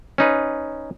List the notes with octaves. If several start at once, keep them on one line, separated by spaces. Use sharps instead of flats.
C#4 D#4 B4